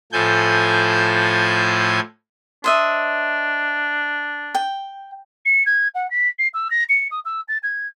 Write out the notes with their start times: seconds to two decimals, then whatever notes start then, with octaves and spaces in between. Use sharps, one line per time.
0.12 A2 F3 A4 G#5 G6
2.64 D4 C5 D#5 E5
4.55 G5
5.45 C#7
5.66 G#6
5.95 F#5
6.10 B6
6.39 C7
6.54 E6
6.71 A#6
6.89 C#7
7.11 D#6
7.25 E6
7.48 A6
7.63 G#6